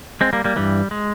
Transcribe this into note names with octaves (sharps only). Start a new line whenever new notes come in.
G#3 C4
G3 A#3
G3 A#3
G2 E3 G3
G#3